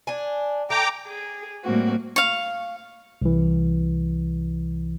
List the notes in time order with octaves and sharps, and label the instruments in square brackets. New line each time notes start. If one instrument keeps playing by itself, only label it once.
[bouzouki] D4 G#5
[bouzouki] A3 [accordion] G5 A#5 D6
[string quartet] G#4
A2 G3 A#3 C4 F#4
[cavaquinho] F5 C#6
[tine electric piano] C2 E3